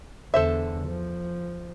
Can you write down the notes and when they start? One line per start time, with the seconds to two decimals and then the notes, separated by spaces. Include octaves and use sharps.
0.34 E2 D3 A4 C5 E5
0.88 F3